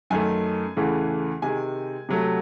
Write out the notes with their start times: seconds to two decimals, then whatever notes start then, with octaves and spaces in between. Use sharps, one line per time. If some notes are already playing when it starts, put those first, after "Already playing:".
0.10 F#2 D#3 A3 G#5
0.77 E2 C#3 E3 A3
1.42 C3 D#3 G#3 G#5
2.09 C3 F#3 A3